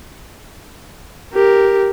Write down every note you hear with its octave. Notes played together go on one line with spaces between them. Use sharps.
G4 A#4